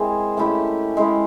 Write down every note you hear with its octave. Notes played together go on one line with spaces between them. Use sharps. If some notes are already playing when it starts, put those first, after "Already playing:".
Already playing: G#3 C4 E4 G#4 A#4
A3 C#4 E4 G4
G#3 C#4 E4